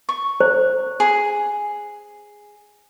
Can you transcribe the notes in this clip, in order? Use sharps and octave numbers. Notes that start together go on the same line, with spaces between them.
C#6
C5
G#4